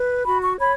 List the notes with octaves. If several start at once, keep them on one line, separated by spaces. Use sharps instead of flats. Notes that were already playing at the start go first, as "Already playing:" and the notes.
Already playing: B4
F#4 B5
C#6
C#5 B5